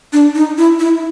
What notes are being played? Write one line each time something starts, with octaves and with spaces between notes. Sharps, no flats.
D4
D#4
E4
E4